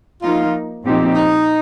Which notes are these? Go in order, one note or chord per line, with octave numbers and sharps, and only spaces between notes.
F3 A#3 D#4 F4
A#2 F3 C4 D#4 G4
D#4